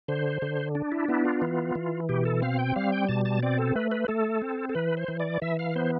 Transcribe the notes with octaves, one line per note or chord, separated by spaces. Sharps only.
D3 C5
D3
D4
E4
B3 E4
F4
E3
E3
B2 G4
A4
C4 F5
G5
G3 F5
G5
B2 A5
A5
C4 D5
A4
A3 B4
B4
A3 A4
C4
A4
E3 B4
C5
E3
D5
E3 E5
F5
B3 C5